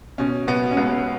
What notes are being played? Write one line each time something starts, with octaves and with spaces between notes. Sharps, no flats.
B2 C#4
B2 B3
C#4
C#2 B3